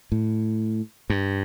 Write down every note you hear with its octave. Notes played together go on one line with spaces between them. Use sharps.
A2
G2